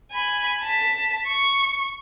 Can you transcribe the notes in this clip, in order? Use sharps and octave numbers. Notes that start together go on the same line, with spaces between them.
G#5 B5
A5 B6
C#6